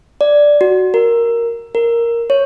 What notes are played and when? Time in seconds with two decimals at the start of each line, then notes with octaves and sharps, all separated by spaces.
0.21 D5
0.61 F#4
0.94 A#4
1.75 A#4
2.30 C#5